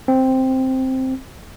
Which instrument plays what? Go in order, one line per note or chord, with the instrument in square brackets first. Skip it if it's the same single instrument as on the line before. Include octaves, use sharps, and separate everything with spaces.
[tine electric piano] C4